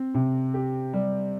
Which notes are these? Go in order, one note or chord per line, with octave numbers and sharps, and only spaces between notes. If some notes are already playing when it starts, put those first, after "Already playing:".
Already playing: C4
C3
G4
G3